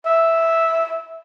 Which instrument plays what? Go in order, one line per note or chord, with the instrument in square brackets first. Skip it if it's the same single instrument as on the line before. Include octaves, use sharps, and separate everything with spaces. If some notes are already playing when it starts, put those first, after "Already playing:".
[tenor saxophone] E5